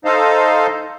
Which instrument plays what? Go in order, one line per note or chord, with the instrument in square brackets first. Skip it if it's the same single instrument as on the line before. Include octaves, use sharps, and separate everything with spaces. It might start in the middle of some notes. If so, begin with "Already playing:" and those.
[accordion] D#4 A4 C5 D#5 F5